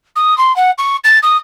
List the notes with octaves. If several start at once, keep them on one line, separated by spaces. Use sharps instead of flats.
D#6
C6
F#5
C#6
A6
D#6